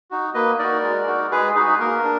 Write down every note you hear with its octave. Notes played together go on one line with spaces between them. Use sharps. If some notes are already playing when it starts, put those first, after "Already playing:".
D#4 F#4
A#3 B4 D#5
D#4 F#4 A#4 D5
G#3
D#4 F#4
G#3 G#4 B4
D#4 F#4 G#4 B4
G#4
A#3 A#4
D4